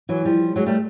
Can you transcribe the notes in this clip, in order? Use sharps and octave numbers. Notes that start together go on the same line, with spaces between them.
E3 F#3
F3 G3
F#3 G#3
G3 A3